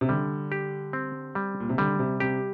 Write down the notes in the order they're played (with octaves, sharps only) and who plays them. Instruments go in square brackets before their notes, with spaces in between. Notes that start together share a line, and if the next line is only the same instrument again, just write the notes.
[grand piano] C3
[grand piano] D3 [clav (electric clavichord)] G3
[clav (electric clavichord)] G4
C4
G3
[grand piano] A#2
C3
[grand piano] D3 [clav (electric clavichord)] G3
[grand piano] C3
[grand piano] C3 [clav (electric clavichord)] G4